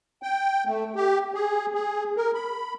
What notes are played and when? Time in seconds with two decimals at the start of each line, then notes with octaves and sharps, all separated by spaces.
0.23 G5
0.67 A3
0.96 G4
1.34 G#4
1.74 G#4
2.17 A#4
2.34 B5